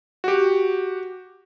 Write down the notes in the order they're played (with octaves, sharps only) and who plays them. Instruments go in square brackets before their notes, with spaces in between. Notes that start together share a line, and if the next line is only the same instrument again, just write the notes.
[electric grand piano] F#4 G4